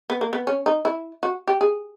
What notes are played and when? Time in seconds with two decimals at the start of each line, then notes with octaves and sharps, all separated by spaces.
0.10 B3
0.21 A#3
0.33 B3
0.47 C#4
0.66 D#4
0.85 E4
1.23 F#4
1.47 G4
1.61 G#4